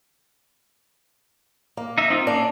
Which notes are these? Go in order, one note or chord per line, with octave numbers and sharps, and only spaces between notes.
A#3
D#4 E5
C4 D#4 F4
A#3 C#4 D4